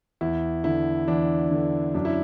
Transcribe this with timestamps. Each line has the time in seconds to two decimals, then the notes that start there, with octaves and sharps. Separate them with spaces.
0.21 E2 E4
0.64 D3 E4
1.08 E2 D4
1.51 D3
1.94 F#2 D4
2.05 E4